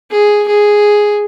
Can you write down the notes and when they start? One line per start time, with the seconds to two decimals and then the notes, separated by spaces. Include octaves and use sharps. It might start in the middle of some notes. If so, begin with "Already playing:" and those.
0.11 G#4
0.48 G#4